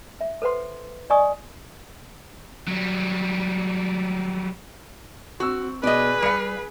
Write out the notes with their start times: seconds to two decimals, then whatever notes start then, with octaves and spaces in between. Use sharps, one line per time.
0.21 E5
0.42 A4 B4 C5 F#5 C6
1.10 D5 D#5 G#5 C#6 D#6
2.68 F#3 G3
5.40 C4 F#4 C#6 E6
5.83 B2 G#4 B4 D5 D#5
6.22 G3 F5 B5 C#7